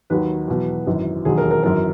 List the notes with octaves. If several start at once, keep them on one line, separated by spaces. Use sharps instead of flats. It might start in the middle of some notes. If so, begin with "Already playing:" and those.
D#2 D#3 F#3 B4
E2 B2 F#3
G#1 F#2 E3
E1 D#2 D#3 F#3 G#4
A#4
A#4
G#1 F#2 E3 A#4